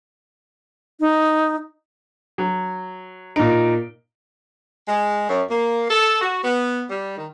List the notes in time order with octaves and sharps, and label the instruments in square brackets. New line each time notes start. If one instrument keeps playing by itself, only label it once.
[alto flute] D#4
[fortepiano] F#3
[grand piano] A#2 D7 [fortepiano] D#4
[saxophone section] G#3
F#2
A#3
A4
F#4
B3
G3
D#3